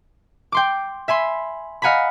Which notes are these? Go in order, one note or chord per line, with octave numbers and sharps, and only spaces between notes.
G5 C6 D6
E5 G#5 B5 C6
D#5 F5 F#5 G#5 A#5 B5